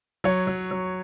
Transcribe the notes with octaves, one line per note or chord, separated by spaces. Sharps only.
F#3 C#5
F#3
F#3